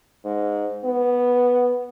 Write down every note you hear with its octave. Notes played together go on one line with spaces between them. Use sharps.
G#2
B3